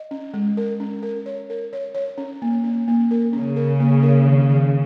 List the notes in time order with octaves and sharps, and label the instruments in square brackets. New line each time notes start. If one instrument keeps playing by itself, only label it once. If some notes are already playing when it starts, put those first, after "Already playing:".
Already playing: [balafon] D#5
C#4
G#3
A#4
C#4
A#4
C#5
A#4
C#5
C#5
C#4
A#3
C#4
A#3
A#4
[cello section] C#3 [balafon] C#4
[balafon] A#4
A#3
A#4
D#3
D#3